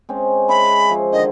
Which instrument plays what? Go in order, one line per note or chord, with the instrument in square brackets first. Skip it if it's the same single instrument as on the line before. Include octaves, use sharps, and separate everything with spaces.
[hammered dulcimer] G#3 C4 C#4
[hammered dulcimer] G#4 E5 C#6 [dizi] B5
[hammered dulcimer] F3
[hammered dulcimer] D3 D#3 [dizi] D#5